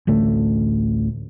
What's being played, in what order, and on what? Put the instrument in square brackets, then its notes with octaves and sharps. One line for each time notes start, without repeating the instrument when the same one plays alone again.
[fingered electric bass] A1 D2 A3